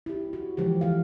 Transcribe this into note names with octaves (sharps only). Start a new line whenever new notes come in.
E4 G4
F#4
E3 F3 G#3 G4
D#3 E3 F5